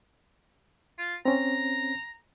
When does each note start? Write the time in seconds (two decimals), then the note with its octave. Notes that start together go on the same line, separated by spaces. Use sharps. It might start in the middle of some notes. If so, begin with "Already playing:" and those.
0.98 F4
1.25 C4 C#4 A#5